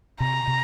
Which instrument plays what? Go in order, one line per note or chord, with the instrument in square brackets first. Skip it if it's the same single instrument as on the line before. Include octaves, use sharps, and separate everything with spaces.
[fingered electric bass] C3 [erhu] A#5
[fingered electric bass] C3